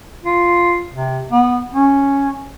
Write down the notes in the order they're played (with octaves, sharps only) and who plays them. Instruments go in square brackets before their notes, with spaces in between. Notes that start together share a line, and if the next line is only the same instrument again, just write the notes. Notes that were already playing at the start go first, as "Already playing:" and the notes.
[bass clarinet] F4
C3
B3
C#4